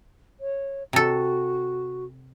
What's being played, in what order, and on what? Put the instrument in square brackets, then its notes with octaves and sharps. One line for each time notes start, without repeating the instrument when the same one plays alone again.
[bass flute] C#5
[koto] C3 A4 [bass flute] F#4